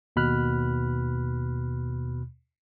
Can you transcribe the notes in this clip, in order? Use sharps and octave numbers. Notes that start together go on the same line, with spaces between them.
D#2 B2 B5 F6 F#6